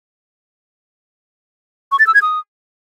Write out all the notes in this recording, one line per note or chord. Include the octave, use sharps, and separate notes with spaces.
C#6
A6
E6
G#6
D#6